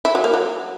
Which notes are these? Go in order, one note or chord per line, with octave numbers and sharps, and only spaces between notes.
E4
F#3
A#3
F#3